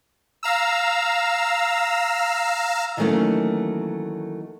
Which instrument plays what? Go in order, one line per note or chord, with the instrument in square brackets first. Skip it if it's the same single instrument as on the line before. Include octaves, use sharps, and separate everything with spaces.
[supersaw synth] F5 A#5 E6
[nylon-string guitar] D#3 E3 F#3 A3 A#3 C#4